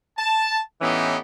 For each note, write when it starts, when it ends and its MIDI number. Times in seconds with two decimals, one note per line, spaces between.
0.18 0.59 81
0.82 1.17 45
0.82 1.17 52
0.82 1.17 59
0.82 1.17 61
0.82 1.17 63
0.82 1.17 67